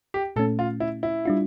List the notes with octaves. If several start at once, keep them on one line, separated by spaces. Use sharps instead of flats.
G4
A#2 A3 C#4 A4
F4
E4
E4
G3 D4 F4